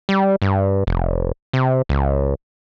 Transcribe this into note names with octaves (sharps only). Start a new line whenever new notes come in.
G3
G2
F1
C3
C#2